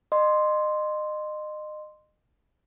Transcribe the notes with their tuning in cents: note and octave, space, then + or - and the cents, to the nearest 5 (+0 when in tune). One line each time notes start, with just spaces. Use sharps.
D#5 -30 C6 +0